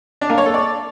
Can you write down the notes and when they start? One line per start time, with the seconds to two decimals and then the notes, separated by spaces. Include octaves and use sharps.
0.21 D4
0.30 A#3
0.38 C#5
0.46 A4
0.54 D5